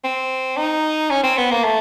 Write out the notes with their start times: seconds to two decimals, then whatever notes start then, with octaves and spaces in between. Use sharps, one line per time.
0.04 C4
0.57 D#4
1.10 C#4
1.23 C4
1.37 B3
1.51 A#3
1.64 A3